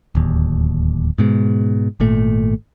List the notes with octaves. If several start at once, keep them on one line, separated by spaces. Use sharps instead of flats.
D1 D#2
G#2 B2 G#3
G#1 A#2 A3